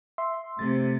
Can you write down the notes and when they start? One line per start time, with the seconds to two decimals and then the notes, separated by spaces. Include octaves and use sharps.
0.18 E5 C6
0.59 C3 A3 A6